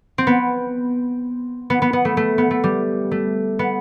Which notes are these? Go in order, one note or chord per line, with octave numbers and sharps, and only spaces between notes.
C4
B3
B3
B3
B3
A3
A3
B3
A3
G3
A3
B3